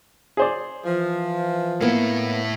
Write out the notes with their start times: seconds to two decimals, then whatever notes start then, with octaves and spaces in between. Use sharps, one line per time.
0.37 G#4 C5 D5
0.85 E3 F3
1.81 A2 A#3 B3 E4